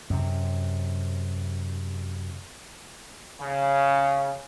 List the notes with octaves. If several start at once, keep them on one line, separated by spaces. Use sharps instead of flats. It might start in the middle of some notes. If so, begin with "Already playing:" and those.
F#2 C3
C#3